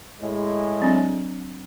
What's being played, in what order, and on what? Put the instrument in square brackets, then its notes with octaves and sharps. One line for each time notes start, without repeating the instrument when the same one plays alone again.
[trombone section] A2 G#3
[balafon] F#3 C4 D4